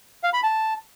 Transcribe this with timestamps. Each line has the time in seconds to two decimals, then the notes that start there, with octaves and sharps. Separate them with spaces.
0.24 F5
0.33 B5
0.43 A5